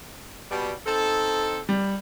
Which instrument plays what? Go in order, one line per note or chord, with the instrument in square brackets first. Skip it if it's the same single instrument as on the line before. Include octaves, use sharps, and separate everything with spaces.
[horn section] B2 G3
C4 D#4 A4
[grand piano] G3